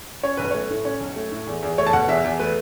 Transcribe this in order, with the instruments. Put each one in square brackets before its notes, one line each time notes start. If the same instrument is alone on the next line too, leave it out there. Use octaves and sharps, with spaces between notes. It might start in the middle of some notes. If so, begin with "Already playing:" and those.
[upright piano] C#4 C#5
B1 B4
A3 C#5
A2
C#4 C#5
B1
A3
A2
E2
E2
A3 C#5
A5
B2 F#5
E2 E5
E2
A3 B4